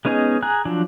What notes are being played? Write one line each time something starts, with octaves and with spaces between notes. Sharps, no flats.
G#3 B3 C#4 D#4 G#4
G#4 G#5 A#5 F#6
F3 F#3 D4